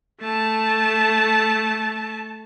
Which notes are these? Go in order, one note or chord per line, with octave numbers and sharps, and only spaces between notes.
A3 A5